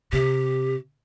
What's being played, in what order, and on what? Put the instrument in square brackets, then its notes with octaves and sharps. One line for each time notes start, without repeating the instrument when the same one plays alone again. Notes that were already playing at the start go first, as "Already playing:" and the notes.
[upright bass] C3 [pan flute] G4